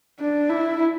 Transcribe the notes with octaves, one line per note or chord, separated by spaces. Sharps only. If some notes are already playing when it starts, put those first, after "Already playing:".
D4
E4